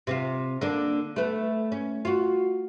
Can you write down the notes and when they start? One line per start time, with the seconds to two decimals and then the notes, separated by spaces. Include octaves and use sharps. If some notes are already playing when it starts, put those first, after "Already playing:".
0.07 C3 C4 F4
0.61 D3 A#3 D4
1.16 A3 B3
1.72 C#4
2.05 F4 F#4